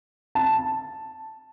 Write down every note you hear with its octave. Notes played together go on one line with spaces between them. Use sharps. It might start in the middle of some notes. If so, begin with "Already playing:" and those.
A5